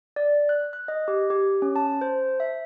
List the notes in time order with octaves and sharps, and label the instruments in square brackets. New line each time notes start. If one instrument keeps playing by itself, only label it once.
[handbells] D5
F#6
F#6
D#5
G4
G4
C#4
A5
C5
E5